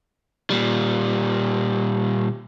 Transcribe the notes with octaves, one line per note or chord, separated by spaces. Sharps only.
A#2 G3